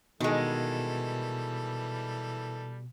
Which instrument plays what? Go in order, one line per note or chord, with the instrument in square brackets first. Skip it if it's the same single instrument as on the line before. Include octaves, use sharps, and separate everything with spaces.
[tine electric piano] B2 [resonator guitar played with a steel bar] D#3 G#3 [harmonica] E3 G3 A4